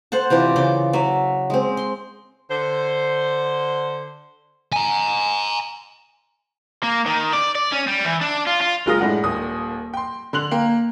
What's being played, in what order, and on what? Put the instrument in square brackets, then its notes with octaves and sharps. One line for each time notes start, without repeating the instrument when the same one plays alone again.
[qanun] A4 C5 F#5 A5
C3 E3 F4 D5
C#3 D5 C6 D6
F#3 E5
G#3 C4
C6
[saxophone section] D3 C5
[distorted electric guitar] G#5 A#5
[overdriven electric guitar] A#3
D#3
D5
D5
C#4
G3
E3
D4
F4
F4
[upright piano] F#1 G#3 F4 A#4 D#6 A#6
A2 G#3 D4 F#5
D#1 D#2 D#6
G5 C6
D3 C6 F#6 F7 F#7
A#3 G5